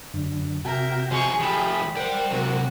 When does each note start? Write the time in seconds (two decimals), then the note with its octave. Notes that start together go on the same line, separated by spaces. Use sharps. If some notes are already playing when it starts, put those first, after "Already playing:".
0.14 F#2 D3
0.65 C3 F#4 A#4 E5 G5
1.11 F3 D#4 G#4 C6 C#6
1.40 F3 A3 G4 G5 B5 D#6
1.96 G3 A#4 C5 F#5 G5
2.31 C3 F#3 F#4